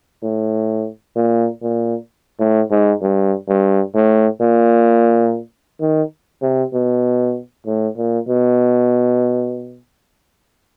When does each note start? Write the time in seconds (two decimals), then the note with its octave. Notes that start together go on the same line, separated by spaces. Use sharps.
0.23 A2
1.16 A#2
1.62 A#2
2.39 A2
2.71 G#2
3.02 G2
3.49 G2
3.95 A2
4.41 A#2
5.81 D#3
6.42 C3
6.74 B2
7.66 A2
7.98 A#2
8.28 B2